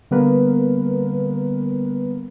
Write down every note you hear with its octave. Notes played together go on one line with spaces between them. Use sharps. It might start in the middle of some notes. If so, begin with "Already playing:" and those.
D3 G3 A#3 B3 A#4 B4